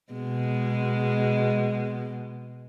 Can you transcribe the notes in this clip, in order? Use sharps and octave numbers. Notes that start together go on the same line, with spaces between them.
B2 G#3